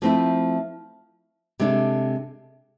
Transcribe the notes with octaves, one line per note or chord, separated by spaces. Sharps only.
F3 A3 C4 E4
C3 G#3 D4 A4